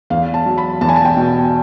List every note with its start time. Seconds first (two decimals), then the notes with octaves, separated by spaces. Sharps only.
0.10 E2 F5
0.34 A5
0.46 F#3
0.58 B5
0.81 E2 A5
0.89 G#5
0.96 A5
1.05 G5
1.17 B2